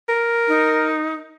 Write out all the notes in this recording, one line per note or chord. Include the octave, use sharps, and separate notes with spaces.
A#4
D#4